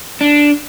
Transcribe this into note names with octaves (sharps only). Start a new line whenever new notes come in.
D4